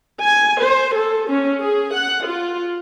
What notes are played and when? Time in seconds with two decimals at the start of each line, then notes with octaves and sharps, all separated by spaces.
0.21 G#5
0.62 C5
0.95 A4
1.28 C#4
1.60 G#4
1.94 F#5
2.26 F4